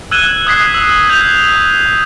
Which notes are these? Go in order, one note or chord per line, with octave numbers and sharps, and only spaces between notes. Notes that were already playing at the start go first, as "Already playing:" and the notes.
E6 F#6 G#6 D#7 E7 G7
D#6 F#6 G#6 B6 C7
E6
G6 G#6 F7